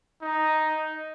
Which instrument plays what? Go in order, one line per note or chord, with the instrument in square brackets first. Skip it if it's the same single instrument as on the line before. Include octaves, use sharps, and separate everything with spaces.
[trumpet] D#4